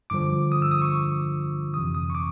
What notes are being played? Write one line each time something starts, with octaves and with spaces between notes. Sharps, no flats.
G2 D3 F3 D6
D#6
E6
D#6
C#6
F2 C3 E3 D#6
D#6
C#6
D6